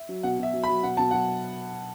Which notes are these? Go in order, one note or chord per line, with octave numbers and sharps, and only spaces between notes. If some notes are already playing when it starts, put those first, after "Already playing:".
Already playing: E5
F#3
B2 F#5
B2 E5
F#3
B5
F#3
B2 F#5
B2 A5
F#3 F#5